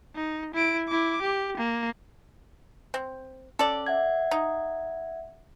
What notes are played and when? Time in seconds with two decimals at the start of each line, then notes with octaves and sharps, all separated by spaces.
0.15 D#4
0.54 E4 D7
0.88 E4 D6
1.22 G4
1.57 A#3
2.94 C4
3.59 C#4 A4 D5
3.86 E5 F#5 G#6
4.31 D#4